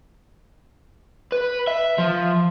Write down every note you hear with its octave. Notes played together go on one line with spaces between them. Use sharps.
B4
E5
F3